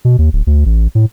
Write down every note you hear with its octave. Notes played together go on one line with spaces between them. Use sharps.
B2
D#2
D1
D2
A1
A2